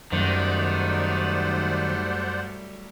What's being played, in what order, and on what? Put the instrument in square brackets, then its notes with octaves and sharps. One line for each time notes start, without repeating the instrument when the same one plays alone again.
[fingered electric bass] F#2 [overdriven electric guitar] D#3 [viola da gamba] F#3 G3 A3 [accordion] C5 D5 F#5